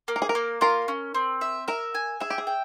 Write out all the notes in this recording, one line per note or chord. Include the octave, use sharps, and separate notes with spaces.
A#3
A#4
G#4
A#4
A#3
F4 A#4
C#4
C4
E5
A#4 E5
G#5
G#4 E5
G4
G#4
G5